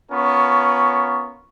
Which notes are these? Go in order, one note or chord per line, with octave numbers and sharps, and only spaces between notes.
B3 C#4 F4 A#4 C#6